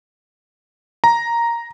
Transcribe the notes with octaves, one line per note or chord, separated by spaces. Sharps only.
A#5